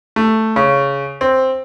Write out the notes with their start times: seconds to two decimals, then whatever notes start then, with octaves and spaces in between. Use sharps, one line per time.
0.16 A3
0.56 C#3
1.21 C4